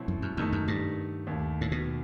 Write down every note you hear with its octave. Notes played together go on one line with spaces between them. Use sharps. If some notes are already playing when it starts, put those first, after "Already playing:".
Already playing: B2 F#3 A3 C4 E4
F#2
F#2
E2 D#3 A3 D#4
F#2
G2
D#2 D#3 A3
A2
B2